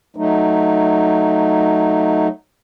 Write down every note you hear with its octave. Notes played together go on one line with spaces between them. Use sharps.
F#3 A3 D#4